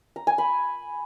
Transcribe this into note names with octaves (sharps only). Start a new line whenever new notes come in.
A#5
G#5
B5